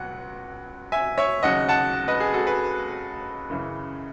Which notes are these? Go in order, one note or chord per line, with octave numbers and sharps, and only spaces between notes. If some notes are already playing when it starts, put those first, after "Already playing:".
Already playing: C#2 B2 F#3 F#5
E5 G#5
C#5 E5
D#2 C#3 F#3 D#5 F#5
F#5 A5
B4 D#5
G#4
F#4 A4
G#4 B4
F#2 C#3 E3